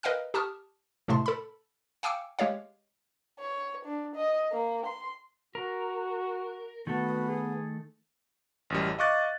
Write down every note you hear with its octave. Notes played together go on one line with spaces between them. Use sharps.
A#4 B4 D#5 F5 G5 F6
G4 A5 C#6 D#6 F6
A2 C3 G#3 A3 A5 C6
A4 B5
F5 G5 G#5 D6 E6 C#7
G#3 G4 C#5 F5
C#5
D4
D#5
A#3
C6
F#4 A#4
D#3 A3 B3 F#4 A4
G#4
A1 F#2 G3
D#5 F5 C#6 D6 F#6 A6